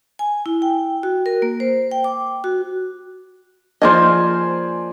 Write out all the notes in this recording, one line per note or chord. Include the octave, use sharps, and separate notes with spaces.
G#5
E4
G5
F#4
A#4
A#3
C5
G5
D6
F#4
F3 A#3 C5 D5 D#5 G#5